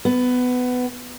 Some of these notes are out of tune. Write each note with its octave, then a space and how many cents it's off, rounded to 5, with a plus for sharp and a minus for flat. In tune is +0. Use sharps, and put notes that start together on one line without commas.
B3 +15